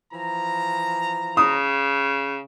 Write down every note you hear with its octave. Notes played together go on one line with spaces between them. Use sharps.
E3 F3 A#5
C#3 D#6